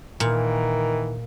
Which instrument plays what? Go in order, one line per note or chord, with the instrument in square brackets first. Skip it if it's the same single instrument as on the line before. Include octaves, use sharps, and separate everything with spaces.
[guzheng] A#2 [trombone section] D#3 E3 A#4